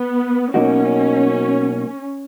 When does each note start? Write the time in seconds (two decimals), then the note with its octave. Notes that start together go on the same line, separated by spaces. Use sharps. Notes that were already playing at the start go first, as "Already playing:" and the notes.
Already playing: B3
0.54 B2 F#3 A#3 C#4 D#4 F#4